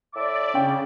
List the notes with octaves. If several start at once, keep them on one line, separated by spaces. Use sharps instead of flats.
A2 D5 E5 D6
C#3 C#4 G5